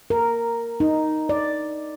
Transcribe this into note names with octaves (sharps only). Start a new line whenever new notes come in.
A#4
D#4
D5